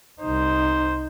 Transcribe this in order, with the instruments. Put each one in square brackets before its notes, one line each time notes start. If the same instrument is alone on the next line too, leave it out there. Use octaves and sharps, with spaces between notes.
[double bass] C2 D#4 [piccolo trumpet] C5